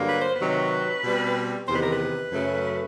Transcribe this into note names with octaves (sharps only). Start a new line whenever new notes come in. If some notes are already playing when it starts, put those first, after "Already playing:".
Already playing: G2 D3 F#3 A#3
B4
C5
C3 D#3 F#3 B4
B2 G3 C4
E2 C3 D#3 C5
B4
A#4
B4
F#2 C#3 F#3 A3